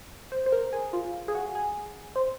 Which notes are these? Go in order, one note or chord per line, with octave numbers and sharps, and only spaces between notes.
C5
C5
A#4
G#4
F4
G#4
F#4
G#4
C5